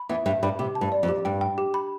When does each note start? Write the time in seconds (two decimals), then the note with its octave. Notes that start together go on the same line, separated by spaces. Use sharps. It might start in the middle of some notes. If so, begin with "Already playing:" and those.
Already playing: B5
0.09 E2 E3 E5
0.26 G2 G3 E5
0.43 G2 G3 B5
0.59 C3 G4
0.75 A5
0.81 G2
0.92 D5
1.03 F2
1.09 G4
1.25 G2 G5
1.41 G5
1.58 G4
1.74 B5